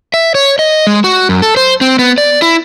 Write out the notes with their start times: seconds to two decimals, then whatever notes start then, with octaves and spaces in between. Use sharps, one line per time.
0.14 E5
0.35 C#5
0.59 D#5
0.87 G#3
1.04 F#4
1.29 F#2
1.42 A4
1.57 C5
1.81 C4
1.99 B3
2.18 D5
2.42 E4